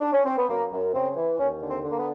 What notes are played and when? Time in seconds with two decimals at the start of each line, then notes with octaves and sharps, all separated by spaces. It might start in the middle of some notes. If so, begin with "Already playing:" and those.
0.01 D4
0.13 C#4
0.26 C4
0.38 B3
0.50 F#2 A#3
0.73 F#2
0.94 C#3 C4
1.16 E3
1.39 D#2 C#4
1.62 D3
1.69 C4
1.84 D3
1.91 A#3
1.98 B3